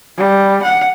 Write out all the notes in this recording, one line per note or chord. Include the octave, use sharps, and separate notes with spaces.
G3
F#5